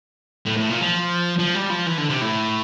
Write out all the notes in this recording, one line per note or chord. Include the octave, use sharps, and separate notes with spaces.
A2
A2
A#2
F3
F3
G3
F3
E3
D3
C3
A2